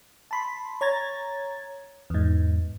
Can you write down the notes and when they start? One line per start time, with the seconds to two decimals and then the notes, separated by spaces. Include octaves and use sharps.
0.31 A5 B5 C6
0.81 C#5 A#5 G#6 A6
2.10 E2 G#2